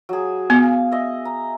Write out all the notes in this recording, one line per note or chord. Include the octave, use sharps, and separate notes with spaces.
F#3 G#4
B3 F5 G#5
D#5 E5
A#5